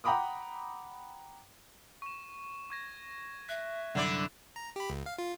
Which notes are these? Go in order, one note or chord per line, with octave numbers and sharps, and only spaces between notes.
F#5 G5 A#5 B5 D6 D#6
C#6 E7
C#6 G#6 A#6
E5 F#6
C2 F#2 D3 D4 E4 D5
A#5
G4 B5
C#2
F5
F4